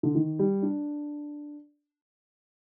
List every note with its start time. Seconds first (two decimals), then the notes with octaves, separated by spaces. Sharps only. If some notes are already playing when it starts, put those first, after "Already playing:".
0.03 D3
0.15 D#3
0.39 G3
0.62 D4